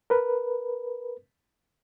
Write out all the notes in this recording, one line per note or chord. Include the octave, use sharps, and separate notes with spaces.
A#4 B4